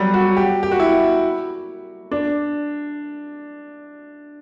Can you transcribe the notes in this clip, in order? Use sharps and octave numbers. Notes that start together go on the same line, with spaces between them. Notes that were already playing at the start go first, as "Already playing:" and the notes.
Already playing: F#3 G3
F#4
G4
G4
F#4
E4
D4